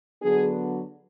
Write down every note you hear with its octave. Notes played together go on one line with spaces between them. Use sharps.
D3 F#3 B3 D4 G#4